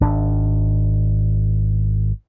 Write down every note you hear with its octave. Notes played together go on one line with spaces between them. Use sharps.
G#1 D4